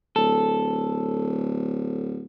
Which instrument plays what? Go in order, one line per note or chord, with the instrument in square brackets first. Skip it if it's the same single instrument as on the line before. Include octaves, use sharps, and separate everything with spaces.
[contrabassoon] D1 [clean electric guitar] A4